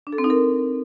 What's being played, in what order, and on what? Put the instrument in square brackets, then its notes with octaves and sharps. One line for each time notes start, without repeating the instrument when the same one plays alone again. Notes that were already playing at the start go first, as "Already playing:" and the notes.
[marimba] D4
A4
C4
D#4
A#4